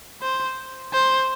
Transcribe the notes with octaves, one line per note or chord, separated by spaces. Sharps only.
C5
C5